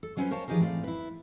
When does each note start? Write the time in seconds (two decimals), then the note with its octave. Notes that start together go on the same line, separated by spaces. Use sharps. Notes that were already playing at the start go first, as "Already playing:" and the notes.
0.03 A4
0.17 F#3 G3 C#4 F4 B4 C5
0.31 A#4 C5 C#5 F5 A5
0.48 E3 F3 D#4 G4 G#4 A#4
0.60 A2 C4 D5 D#5 F5
0.84 E4 B4